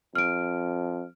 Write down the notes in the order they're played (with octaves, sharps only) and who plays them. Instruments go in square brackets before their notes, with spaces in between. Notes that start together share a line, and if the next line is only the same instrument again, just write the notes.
[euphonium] F2 [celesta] F6 D7